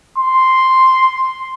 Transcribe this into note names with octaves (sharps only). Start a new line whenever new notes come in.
C6